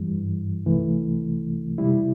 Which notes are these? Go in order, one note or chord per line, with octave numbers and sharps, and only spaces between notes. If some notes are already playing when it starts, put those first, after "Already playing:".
Already playing: G2 E3 G3
C2 C3 E3 A3
C3 G3 E4